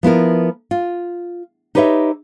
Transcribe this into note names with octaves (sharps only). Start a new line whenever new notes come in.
F3 B3 E4 A#4
F4
D#4 G4 B4 C#5 D#5 E5